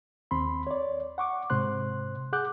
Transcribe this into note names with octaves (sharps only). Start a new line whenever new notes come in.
D#2 C4 B5 C6
C#5 D5
F#5 C#6 D6
G#2 C3 C5 C6 F#6
G#4 F#5 D6 F#6 G6